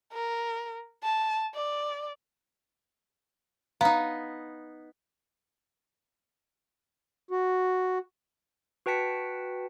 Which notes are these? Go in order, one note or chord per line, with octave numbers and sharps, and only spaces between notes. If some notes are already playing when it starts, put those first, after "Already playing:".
A#4
A5
D5
B3 D#4 F5 A#5
F#4
F#4 B4 G5 A5 B6 C#7